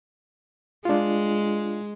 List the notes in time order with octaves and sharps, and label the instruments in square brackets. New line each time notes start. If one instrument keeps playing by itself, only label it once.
[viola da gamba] G#3 [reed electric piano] D4 F4